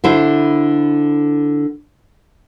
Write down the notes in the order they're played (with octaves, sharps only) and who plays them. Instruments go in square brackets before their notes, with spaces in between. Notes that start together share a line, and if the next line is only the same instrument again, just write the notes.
[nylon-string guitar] D3 E4 C5